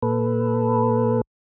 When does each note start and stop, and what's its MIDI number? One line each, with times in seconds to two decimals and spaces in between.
0.02 1.21 46
0.02 1.21 69
0.02 1.21 71